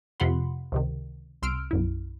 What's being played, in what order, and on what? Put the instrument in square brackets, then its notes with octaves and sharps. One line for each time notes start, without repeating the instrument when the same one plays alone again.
[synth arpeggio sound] F2 C3 F4 F#5 B5 C6
C#2 C3 D#3
C2 C6 E6 F6 D7
B1 F#2 E4